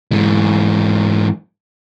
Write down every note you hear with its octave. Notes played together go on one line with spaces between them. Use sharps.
G#2 E3